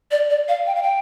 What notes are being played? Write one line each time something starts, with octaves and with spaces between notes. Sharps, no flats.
D5
D5
F5
G5
F5
G5